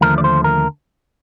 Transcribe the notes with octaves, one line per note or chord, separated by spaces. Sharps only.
D#2 D3 F3 A3 A#4
D5
C5
A#4